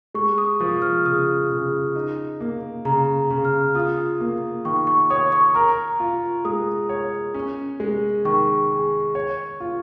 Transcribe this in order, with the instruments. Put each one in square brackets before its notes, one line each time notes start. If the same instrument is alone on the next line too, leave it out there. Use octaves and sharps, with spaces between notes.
[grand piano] G#3 [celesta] C#6
[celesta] D#6
[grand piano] F3 [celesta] D#6
[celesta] F6
[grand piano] C#3 [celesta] D#6
[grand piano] C#3
D#4
A#3
[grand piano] C#3 [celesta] A#5
[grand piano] C#3
[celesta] F6
[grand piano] F4 [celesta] D#6
[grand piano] A#3
[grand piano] D#3 [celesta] C#6
[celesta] C#6
[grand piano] C#5 [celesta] D#6
[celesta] C#6
[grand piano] A#4 [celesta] A#5
[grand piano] F4
[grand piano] G#3 [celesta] D#6
[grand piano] C#5
C#4
G#3
[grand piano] D#3 [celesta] C#6
[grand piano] G#4
C#5
F4